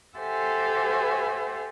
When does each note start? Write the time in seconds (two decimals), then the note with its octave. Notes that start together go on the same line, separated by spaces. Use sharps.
0.18 G4 A4 C5 E5 F#5 G#5